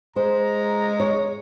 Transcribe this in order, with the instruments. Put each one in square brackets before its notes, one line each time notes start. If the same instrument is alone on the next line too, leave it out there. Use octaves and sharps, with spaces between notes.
[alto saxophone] G#3 [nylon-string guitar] C5 [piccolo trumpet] A#5
[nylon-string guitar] C#5